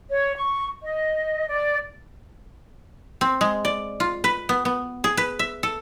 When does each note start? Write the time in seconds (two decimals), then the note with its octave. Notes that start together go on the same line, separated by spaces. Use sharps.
0.10 C#5
0.37 C#6
0.83 D#5
1.50 D5
3.21 C4
3.41 G#3
3.65 D5
4.00 F4
4.24 B4
4.49 B3
4.65 B3
5.04 G#4
5.17 B4
5.39 E5
5.63 A4